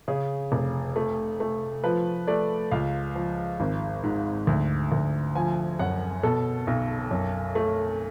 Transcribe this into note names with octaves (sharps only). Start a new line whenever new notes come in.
C#3 G#4
F1
A3
A3
F3 B4
A3 D5
C#2 F5
F3
G#1
G#2
D2
D2
F3 G#5
F#2 F#5
B2 A4
B1
F#2
A3